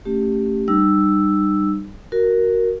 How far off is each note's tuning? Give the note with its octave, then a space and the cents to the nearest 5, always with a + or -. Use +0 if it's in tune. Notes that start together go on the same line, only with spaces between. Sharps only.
A3 +20 C#4 +0 G4 +0
G3 -5 D#4 -35 E6 +0
F#4 +5 A#4 +0